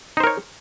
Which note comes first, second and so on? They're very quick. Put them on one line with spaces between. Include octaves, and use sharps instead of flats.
D#4 C5 A#4 C#5